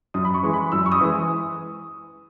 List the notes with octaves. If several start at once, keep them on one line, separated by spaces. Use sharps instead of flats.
F#2 D#6
B5
C#6
E3 G#3
B5
F#2 E6
C#6
D#6
E3 G#3